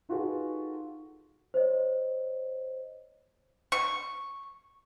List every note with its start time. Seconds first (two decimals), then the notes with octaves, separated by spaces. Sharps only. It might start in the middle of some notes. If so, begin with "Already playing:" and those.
0.09 D#4 F4 F#4 G#4 A4 B4
1.54 C5 C#5 D#5
3.72 C#6